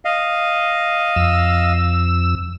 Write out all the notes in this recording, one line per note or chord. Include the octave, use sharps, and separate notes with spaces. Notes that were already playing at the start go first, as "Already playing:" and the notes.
D#5 F5
F2 E6